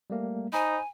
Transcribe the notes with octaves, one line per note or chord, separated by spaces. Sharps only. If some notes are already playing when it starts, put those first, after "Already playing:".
G3 A3 A#3
D#4 C5 G#5 A#5 B5